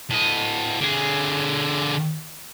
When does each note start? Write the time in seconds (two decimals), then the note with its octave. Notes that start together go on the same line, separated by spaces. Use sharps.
0.10 A2 D#5
0.81 D3 G#4